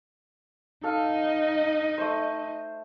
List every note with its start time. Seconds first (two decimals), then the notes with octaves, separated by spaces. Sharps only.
0.83 D#4 A4 D#5 F5
1.98 A3 C5